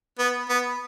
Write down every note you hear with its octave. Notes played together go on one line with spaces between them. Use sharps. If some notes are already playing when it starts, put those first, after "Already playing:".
B3
B3